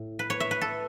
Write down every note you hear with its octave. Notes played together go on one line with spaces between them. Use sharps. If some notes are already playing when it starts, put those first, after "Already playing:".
Already playing: A2
B4
C#5
E5
B4
A4